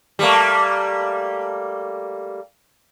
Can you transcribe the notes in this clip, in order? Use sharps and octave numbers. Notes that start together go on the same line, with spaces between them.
G3 A3 A#3